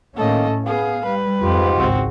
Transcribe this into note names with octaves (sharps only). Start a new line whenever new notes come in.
A2 D#3 A3 A#3 C#4 A4 D#5
B3 G#4 F5
G3 B4
F2 G#2 F4 G4
G#1 C#2 C4 F#4